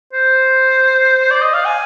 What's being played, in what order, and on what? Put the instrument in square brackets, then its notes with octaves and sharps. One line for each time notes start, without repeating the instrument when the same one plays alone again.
[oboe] C5
D5
D#5
F5
G#5